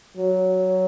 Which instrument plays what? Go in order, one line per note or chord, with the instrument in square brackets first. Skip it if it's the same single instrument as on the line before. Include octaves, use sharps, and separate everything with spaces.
[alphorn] F#3